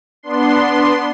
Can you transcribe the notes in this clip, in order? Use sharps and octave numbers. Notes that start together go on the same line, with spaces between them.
B3 D4 C6